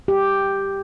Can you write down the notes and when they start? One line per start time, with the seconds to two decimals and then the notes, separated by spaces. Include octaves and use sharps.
0.08 G4